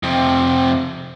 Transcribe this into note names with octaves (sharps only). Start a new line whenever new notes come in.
F2 C3